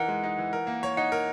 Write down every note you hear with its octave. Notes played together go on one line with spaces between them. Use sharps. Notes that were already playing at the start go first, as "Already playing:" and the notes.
Already playing: E3 D#4 A#4 F#5
G#3
D#4
E3
A#4
A#3
C#5
D#4 F#5
A#4